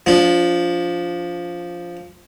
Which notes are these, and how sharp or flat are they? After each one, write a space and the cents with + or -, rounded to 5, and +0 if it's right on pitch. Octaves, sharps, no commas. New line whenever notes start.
F3 +0 D4 -30